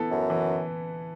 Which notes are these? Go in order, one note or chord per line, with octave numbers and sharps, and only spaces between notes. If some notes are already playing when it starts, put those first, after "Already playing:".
Already playing: E3 B3 E4 A4
F#2
E3